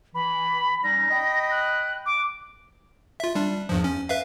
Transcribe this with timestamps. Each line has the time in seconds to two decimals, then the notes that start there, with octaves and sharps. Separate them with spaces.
0.15 E3 B5
0.84 G3 C#4 D#4 A#6
1.10 D#5 G5 B5
1.51 F#6
2.06 D6
3.20 F4 E5
3.35 G3 D4
3.69 E2 G2 F3
3.84 C#4
4.09 B4 E5 F5